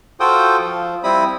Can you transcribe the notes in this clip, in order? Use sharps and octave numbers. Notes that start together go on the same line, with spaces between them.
F4 F#4 A4 C5 G5 D#6
F3
G3 C4 E4 B5 D#6